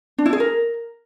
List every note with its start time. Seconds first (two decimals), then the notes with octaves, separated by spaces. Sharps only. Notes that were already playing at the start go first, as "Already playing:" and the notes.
0.18 D4
0.26 E4
0.33 G#4
0.40 A#4